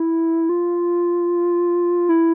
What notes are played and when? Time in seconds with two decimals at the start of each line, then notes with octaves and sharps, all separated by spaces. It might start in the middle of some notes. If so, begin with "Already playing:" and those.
Already playing: E4
0.49 F4
2.09 E4